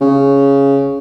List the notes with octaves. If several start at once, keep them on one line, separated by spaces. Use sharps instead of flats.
C#3